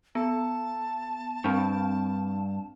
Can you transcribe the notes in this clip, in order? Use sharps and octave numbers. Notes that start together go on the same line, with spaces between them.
B3 A5
G2 C4 D4